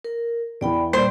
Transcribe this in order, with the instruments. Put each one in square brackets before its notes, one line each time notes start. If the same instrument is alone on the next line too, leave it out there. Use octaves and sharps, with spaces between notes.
[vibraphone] A#4
[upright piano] E2 E3 [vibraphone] D5 G5 B5
[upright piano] A#2 [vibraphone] G3 D5 [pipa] C5